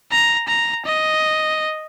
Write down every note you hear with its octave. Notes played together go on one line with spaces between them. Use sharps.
A#5
A#5
D#5